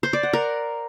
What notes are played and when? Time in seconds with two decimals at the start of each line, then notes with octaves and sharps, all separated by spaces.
0.03 C5
0.13 D5
0.23 F#5
0.33 A#4